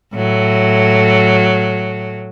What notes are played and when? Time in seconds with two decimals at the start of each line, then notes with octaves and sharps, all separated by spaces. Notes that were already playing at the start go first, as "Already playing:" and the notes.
0.15 A2 F#3